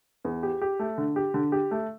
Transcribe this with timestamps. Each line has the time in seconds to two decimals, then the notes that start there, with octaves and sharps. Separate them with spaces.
0.24 E2
0.43 G4
0.62 G4
0.79 A3
0.98 D3
1.16 G4
1.34 D3
1.52 G4
1.71 A3